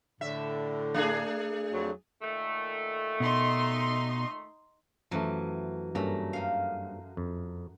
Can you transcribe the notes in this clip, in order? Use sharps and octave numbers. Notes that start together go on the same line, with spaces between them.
A2 D3 E5
A3 D4 G#4
F2 F#3
A#2 D#3 A3
B2 D#4 C6
F#2 E3 F3 A3
G2 A3 A#3 C#4 A#5
F#2 F5
F2